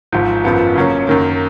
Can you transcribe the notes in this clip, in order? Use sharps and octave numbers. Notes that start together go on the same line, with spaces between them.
G#1 G#2 F3
G#1 F#2 F3 B3
C#3 F#3 A#3 C#4
F#2 D#3 A#3